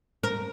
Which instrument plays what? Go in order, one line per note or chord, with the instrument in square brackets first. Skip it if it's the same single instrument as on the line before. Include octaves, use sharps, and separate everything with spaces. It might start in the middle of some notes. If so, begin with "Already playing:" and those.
[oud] A#4